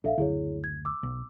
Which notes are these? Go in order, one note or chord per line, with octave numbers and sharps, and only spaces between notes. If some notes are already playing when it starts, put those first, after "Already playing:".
A#1 D4 A4 E5 F5
F#1 D2 E4 G#4 C#5
G#6
D6 E6
B1